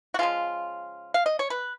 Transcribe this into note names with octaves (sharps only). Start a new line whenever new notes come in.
F#4
C#3 F3 G#3 F4
F5
D#5
C#5
B4